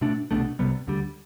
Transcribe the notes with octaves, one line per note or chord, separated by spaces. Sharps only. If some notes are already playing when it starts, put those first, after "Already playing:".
B2 A3 D4
C2 B2 A3 D4
C2 C3 G3 B3
D2 D3 G3